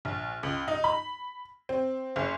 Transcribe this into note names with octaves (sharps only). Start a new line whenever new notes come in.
A#1
C#2
D#4
B5
C4
F#1